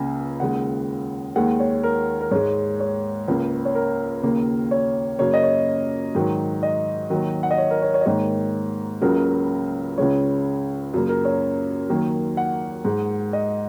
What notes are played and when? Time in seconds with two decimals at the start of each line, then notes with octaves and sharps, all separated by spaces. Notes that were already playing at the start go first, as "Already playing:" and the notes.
Already playing: C#2 C#3 A#3 G#5
0.40 D#2 C#3 G#3 F#5
1.36 D#2 D#3 G#3 F#5
1.60 C#5
1.83 A#4
2.21 A#4
2.31 G#2 G#3 C#5
2.80 C#5
3.28 C#2 C#3 A#3
3.65 C#5
3.75 A#4
4.23 D#2 C#3 A#3
4.71 C#5
5.19 F#2 C#3 A#3 C#5
5.34 D#5
5.43 C#5
6.15 G#2 D#3 F#3
6.63 D#5
7.10 D#2 D#3 F#3
7.43 F#5
7.51 D#5
7.58 C#5
7.71 A#4
7.82 C#5
7.94 C#5
8.01 D#5
8.06 G#2 D#3 A#3 C#5
9.01 C#2 C#3 F#3 A#3 A#4
9.98 C#2 C#3 G#3 C#5
10.94 F#2 C#3 A#3
11.09 A#4
11.25 C#5
11.89 D#2 D#3 F#3 A#3
12.37 F#5
12.85 G#2 G#3
13.33 D#5